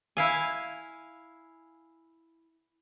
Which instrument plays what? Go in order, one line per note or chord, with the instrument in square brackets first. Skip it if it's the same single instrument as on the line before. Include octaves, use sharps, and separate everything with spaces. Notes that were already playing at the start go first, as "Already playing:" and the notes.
[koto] E4 F5 G#5